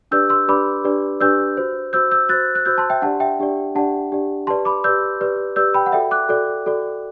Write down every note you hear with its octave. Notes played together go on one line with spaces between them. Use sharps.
D4 G4 B4 D5 E6 G6
C6 E6
D4 G4 B4 D5 B5 D6
D4 G4 B4 D5
D4 G4 B4 D5 E6 G6
F#4 C5
F#4 C5 E6 G6
E6 G6
F#4 C5 F#6 A6
F#6
F#4 C5 E6 G6
A5 C6
E5 G5
D4 G4 D5 F#5 A5
E5 G5
D4 G4 D5
D4 G4 D5 F#5 A5
D4 G4 D5
G4 B4 D5 A5 C6
B5 D6
G4 B4 D5 E6 G6
G4 B4 D5
G4 B4 D5 E6 G6
G5 B5
F#5
F#4 A4 D5 E5 G5
D6 F#6
F#4 A4 D5
F#4 A4 D5